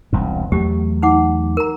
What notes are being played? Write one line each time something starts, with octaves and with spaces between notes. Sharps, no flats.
E1 C2 G2
E2 F#3 A3 G4
D#4 F#5 D6
A#4 A#5